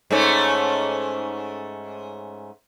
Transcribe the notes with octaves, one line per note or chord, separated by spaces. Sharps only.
G#2 A3 C#4